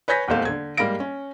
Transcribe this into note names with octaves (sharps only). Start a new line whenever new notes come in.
B4 C#5 G#5 G6 A#6 B6
D#1 E2 D#3 A3 C5 F5
D3 G#6
G#2 G3 A#3 F5 A#6 D7
C#4